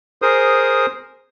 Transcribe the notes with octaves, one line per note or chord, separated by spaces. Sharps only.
G#4 A#4 C5 D#6